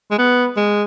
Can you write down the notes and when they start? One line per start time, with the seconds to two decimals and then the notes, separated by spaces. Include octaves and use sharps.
0.11 G#3
0.18 B3
0.57 G#3